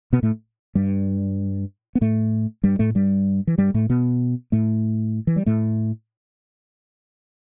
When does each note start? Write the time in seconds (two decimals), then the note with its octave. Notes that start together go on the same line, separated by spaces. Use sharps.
0.13 B2 B3
0.23 A2 A3
0.75 G2 G3
1.95 B3
2.01 A2 A3
2.64 G2 G3
2.79 A2 A3
2.95 G2 G3
3.47 E3
3.58 G2 G3
3.74 A2 A3
3.89 B2 B3
4.52 A2 A3
5.27 E3
5.36 G3
5.46 A2 A3